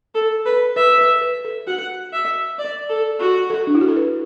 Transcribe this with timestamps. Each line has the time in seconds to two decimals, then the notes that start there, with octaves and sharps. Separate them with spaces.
0.15 A4
0.46 B4
0.76 B4 E5
0.98 B4
1.22 B4
1.45 A4
1.67 F#4 F#5
2.13 E5
2.59 D5
2.90 A4
3.19 F#4
3.50 A4
3.67 D4
3.75 E4
3.81 F#4
3.88 A4
3.96 B4